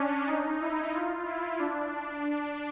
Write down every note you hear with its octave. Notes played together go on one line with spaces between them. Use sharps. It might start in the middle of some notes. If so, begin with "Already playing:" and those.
Already playing: C#4 D4
D#4
E4
F4
E4
D4